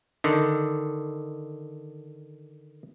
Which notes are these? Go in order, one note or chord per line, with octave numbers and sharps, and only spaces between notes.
D3 D#3